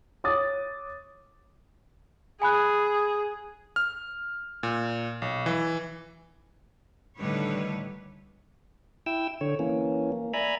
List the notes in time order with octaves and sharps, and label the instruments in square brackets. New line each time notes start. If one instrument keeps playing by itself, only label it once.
[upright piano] C#5 D6 D#6 A6
[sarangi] G#4 [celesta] G#5 B5 F#6
[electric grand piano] F6
A#2
B1
E3
[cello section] A2 D3 D#3 G3 B4 C#5
[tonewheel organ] E4 G5 E6
D3 C#5
E3 A#3 C#4
A#3
D5 E5 G#5 A#5 B5